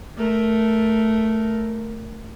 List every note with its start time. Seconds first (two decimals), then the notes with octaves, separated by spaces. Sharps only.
0.17 A3 A#4